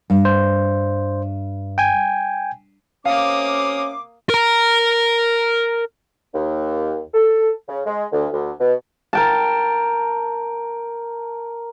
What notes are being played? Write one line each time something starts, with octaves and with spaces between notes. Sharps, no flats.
G2
C5
G5 G#5
C3 A#3 C#4 F5 D6 D#6
A#4 A#5
D#2
A4
C#3
G#3
D2
D2
B2
A#4 G5 A5